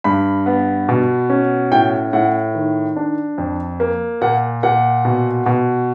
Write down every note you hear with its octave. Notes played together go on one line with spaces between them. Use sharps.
G2 B5
B3
B2
C#4
A2 G5
A2 F#5
D#3
D4
F2
A#3
A#2 F#5
A#2 F#5
B2
B2